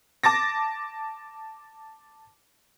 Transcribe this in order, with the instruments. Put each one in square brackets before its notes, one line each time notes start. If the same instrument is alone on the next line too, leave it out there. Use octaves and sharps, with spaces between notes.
[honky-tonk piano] A5 D6 A6 A#6